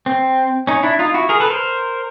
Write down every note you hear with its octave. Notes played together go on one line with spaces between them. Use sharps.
C4
C#4 D#4
D4 E4
D#4 F4
E4 F#4
G#4 A#4
A4 B4
A#4 C5